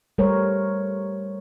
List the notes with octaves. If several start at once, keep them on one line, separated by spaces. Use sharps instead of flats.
G3 A3 A#4 C5 C#5